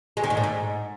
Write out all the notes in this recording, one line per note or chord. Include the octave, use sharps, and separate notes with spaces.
G#3
D#3
G#2
A2
G#2